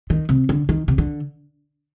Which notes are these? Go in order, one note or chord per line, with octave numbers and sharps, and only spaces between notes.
D#3
C3
D3
D#3
C3
D3